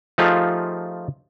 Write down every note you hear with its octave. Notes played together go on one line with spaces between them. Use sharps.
F3 A3 D#4 F4 G4 G#4